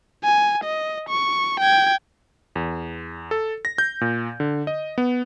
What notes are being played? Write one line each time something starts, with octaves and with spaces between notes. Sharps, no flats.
G#5
D#5
C#6
G5 G#6
E2
A4
A#6
G6
A#2
D3
D#5
B3